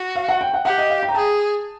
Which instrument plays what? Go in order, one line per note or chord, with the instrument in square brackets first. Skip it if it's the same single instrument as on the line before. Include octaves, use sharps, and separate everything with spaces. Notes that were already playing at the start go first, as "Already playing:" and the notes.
Already playing: [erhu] F#4
[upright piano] F5
F#5
G5
F#5
[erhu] G4 [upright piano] F#5
[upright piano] D#5
F5
G5
A#5
[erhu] G#4 [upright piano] A5